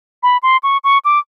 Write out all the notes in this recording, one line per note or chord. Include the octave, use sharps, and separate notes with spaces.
B5
C6
C#6
C#6
D6